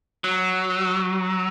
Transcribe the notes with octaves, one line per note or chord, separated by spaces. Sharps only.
F#3